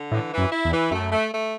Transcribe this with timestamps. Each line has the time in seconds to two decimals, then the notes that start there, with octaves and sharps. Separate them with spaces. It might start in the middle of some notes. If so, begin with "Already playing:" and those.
Already playing: D3
0.11 A2 E3
0.32 E3
0.38 F#2
0.51 E4
0.65 E2
0.71 E3
0.91 F#2 A3
1.11 A3
1.31 A3